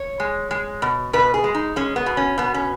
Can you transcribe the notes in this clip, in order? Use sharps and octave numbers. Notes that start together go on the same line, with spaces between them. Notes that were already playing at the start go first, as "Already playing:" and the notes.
Already playing: C#5
G#3
G#3
B2
B2 B4
G#4
G#3
D#4
G#3 C#4
B3
B2
C#4
B2 B3
C#4